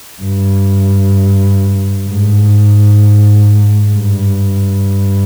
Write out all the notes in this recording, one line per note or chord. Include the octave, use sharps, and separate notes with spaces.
G2
G#2
G2